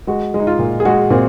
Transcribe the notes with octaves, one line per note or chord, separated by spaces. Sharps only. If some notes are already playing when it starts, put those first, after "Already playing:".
G#3 F#4
G#3
D#4
F4
A#2
G#4
G#3 F#4
A#2 C4